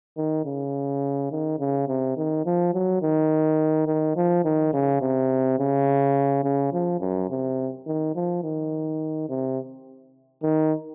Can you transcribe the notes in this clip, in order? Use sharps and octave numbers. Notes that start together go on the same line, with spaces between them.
D#3
C#3
D#3
C#3
C3
D#3
F3
F#3
D#3
D#3
F3
D#3
C#3
C3
C#3
C#3
F3
F#2
C3
D#3
F3
D#3
C3
D#3